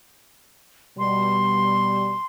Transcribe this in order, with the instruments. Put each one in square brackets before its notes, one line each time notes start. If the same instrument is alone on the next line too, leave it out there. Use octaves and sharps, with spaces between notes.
[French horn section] B2 G3 [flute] C6